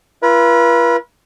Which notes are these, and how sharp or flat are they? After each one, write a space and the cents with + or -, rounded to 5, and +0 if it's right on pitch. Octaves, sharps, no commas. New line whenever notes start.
F4 -40 B4 -35